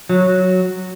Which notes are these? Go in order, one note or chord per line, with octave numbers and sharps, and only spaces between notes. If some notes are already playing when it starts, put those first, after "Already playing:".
F#3